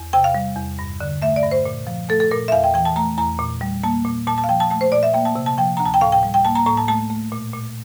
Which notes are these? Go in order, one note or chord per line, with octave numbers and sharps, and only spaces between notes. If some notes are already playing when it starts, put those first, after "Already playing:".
Already playing: E2
C3 G5
F5
G3
E2
G2
D3
A3 E5
D5
G2
C5
A#2
F3
A3 A4
A4
A#2 A#4
E5
E2 F5
G5
E3 G5
A5
A3 A#5
E2 A#5
A#2
G3
A#3 A5
A#2
A#2 A5
A5
F5
F3 G5
A5
A3 A5
C5
A#2 D5
E5
A#3 G5
A5
C3
A5
F3 G5
D2 A#5
A5
G5
A2 F5
G5
G3
G5
A#3 A5
A#5
A2 A#5
A5
A3 A5
A3
A#2
A#2